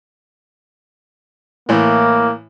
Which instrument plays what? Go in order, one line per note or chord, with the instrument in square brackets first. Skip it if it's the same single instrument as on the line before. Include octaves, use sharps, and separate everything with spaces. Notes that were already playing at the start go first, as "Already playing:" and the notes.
[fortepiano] A2 E3 [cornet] A#3